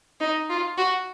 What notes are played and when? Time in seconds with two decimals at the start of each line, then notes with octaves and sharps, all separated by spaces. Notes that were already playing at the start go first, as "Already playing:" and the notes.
0.21 D#4
0.50 F4
0.78 F#4